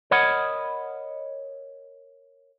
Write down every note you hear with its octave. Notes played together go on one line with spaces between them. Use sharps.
A#4 C#5 D#5 F#5 B5